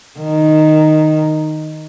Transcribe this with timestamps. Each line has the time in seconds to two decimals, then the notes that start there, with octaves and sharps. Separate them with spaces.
0.20 D#3